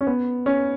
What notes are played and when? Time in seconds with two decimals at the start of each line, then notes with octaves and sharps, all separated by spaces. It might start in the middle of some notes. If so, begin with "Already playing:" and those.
0.01 C#4
0.07 B3
0.46 C#4